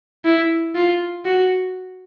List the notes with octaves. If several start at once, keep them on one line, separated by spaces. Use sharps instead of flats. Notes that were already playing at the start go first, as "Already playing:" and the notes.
E4
F4
F#4